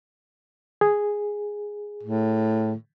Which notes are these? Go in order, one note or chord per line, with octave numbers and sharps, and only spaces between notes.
G#4
A2